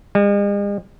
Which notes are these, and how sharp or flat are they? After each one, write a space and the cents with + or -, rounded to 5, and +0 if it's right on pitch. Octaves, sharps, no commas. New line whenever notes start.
G#3 -45